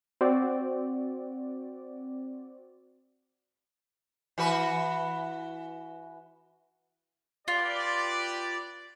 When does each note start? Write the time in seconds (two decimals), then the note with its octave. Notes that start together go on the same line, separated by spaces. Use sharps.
0.21 C4 F#4 D5
4.38 E3 F#4 B4
7.48 F4 G4 B4 D5